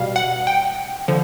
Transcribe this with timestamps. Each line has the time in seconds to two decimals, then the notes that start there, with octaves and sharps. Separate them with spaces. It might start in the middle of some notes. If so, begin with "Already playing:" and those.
Already playing: B2 G3 F5
0.16 F#5
0.47 G5
1.08 D3 F3